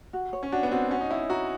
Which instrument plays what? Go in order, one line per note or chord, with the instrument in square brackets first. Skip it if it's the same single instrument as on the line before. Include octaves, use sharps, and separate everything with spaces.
[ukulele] F#4
C#5
[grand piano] C#4
[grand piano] D4 [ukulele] F#4
[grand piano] B3
[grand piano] C4 [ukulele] F#4
[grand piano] C#4 [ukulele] F#4
[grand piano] D#4
[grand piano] E4 [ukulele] C#5
[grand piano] F#4 [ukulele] A#4